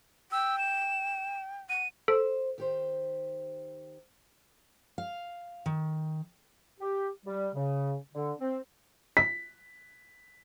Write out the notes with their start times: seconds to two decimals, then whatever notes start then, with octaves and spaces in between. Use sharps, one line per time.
0.32 G5 E6
0.58 E7
1.69 F#5 D#7
2.08 A4 C5
2.58 D#3 G4 C5
4.98 F5
5.66 D#3
6.79 G4
7.25 G3
7.55 C#3
8.14 D3
8.40 C4
9.17 B6